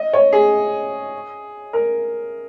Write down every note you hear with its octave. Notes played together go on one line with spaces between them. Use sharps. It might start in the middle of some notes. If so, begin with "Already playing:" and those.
Already playing: D#5
C#5
G#4
A#4